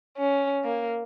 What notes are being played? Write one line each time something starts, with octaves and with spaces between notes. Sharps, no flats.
C#4
A#3